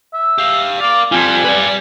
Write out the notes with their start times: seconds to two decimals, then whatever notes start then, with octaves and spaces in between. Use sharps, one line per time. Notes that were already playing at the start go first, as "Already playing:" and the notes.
0.14 E5
0.38 G4 F5
0.80 A#4 D5 F5
1.12 G3 C4 F4 G#5
1.44 B4 D5